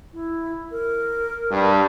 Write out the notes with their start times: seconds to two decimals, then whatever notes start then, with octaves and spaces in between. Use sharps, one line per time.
0.13 E4
0.71 A#4
1.51 G2